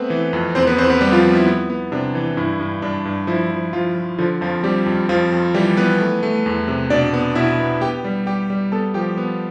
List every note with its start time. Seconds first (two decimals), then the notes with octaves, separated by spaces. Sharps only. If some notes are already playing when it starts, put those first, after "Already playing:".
Already playing: A3 B3 C4 B4
0.10 E3
0.33 F2
0.55 E2 C4 C5
0.67 B3 B4
0.78 E2 C4 C5
0.90 B3 B4
1.01 G3 B3 G4
1.12 F3 F4
1.24 B3
1.35 E4
1.46 B3
1.70 B3
1.92 C3 D4
2.15 E3
2.37 G2 E4
2.60 G2
2.82 G2 D4
3.05 G2
3.27 F3 E4
3.51 F3
3.73 F3 F4
3.96 F3
4.18 D3 F3 F4
4.41 F2 F3 F4
4.63 G3 C4 G4
4.86 F2
5.09 F2 F3 F4
5.32 F2
5.54 E3 G3 G4
5.77 E3 B3 B4
6.00 A3
6.23 A3
6.46 E2
6.68 C3
6.90 B2 D4 D5
7.13 B3
7.35 B2 E4 E5
7.59 B3
7.81 B3 G4 G5
8.04 G3
8.26 G3 G4 G5
8.50 G3
8.72 B3 A4 A5
8.94 F3 G4 G5
9.17 B3